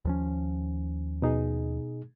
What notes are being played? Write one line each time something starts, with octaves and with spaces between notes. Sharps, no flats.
D#2 F3 C#4
B2 D#4 G#4